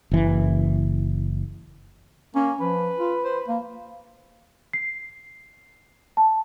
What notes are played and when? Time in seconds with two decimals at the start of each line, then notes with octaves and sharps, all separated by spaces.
0.11 F#1 E3
2.35 A#3 C#4
2.60 F3 B4
2.97 F4
3.24 C5
3.48 A#3
4.73 C7
6.17 A5